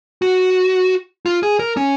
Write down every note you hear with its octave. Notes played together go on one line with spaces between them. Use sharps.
F#4
F4
G#4
A#4
C#4